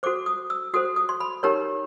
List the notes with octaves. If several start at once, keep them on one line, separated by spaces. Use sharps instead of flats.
F#4 A4 C5 D6
D#6
E6
F#4 A4 C5 D#6
D#6
C6
B5
D#4 G4 A#4 C#5 A#5